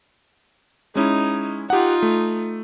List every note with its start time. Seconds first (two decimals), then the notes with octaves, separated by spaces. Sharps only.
0.95 G#3 C#4 D#4 E4
1.70 D#4 F4 G4 F#5
2.02 A3